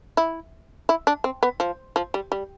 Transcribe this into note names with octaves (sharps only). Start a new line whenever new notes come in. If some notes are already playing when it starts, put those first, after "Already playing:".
E4
E4
D4
C4
B3
F3
F3
G3
G3